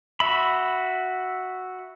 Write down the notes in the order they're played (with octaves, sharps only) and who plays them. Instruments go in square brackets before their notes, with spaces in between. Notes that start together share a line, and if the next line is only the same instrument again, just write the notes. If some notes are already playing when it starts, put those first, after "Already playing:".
[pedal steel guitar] F#4 E5 B5